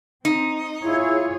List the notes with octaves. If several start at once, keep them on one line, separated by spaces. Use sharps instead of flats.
C4 D#4
E4 F4 G#4 C#5